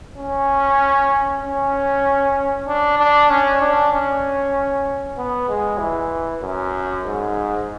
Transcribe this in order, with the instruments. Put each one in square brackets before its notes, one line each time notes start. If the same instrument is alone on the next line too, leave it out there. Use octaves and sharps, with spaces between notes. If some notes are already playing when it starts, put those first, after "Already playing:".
[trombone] C#4
C#4
D4
D4
C#4
D4
C#4
B3
G#3
E3
F#2
G#2